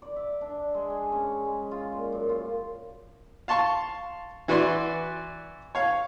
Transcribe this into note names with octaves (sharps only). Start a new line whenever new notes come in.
D5
E5
D4
G#3
G#3
C#4
G#3
F4
A#2
F#2
F4
F5 A5 C6 C#6
E3 F#4 B4 D5 C6
C#5 F5